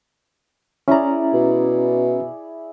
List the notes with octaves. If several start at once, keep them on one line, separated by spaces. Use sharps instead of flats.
C#4 E4 G#4 D5 A#5
B2